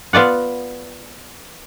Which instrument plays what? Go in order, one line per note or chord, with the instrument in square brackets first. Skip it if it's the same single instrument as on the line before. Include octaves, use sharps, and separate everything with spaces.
[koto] B3 F4 D5 F#5